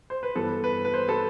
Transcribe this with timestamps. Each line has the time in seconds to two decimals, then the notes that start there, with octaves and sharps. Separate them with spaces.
0.10 C5
0.23 B4
0.35 G2 E3 B3 A4
0.64 B4
0.85 B4
0.94 C5
1.09 A4